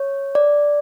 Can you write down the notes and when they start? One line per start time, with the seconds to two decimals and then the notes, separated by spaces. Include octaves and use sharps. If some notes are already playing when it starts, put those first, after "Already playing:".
Already playing: C#5
0.35 D5